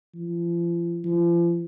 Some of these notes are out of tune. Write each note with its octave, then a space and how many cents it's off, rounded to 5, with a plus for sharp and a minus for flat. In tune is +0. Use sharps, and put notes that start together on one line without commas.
F3 -40
F3 -35